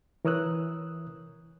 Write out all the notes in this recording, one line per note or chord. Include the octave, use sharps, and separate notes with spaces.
E3 A#4 C#5 D#6 E6 F#6